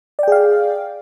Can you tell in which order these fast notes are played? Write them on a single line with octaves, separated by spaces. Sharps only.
D5 G5 G#4 F5